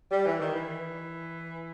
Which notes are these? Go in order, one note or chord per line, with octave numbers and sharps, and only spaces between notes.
G3
E3
D#3
E3